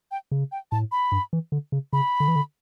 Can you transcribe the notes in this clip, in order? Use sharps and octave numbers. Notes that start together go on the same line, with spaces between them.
G5
C#3
G5
A2 A5
B5
G2
E3
D3
C#3
C#3 B5
D3
E3
D3